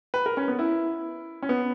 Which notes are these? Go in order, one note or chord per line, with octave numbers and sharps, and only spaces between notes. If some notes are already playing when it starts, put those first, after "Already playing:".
B4
A#4
C#4
B3
E4
C#4
B3